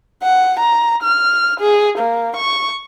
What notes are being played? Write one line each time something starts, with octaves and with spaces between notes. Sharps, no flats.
F#5
A#5
F6
G#4
A#3
C#6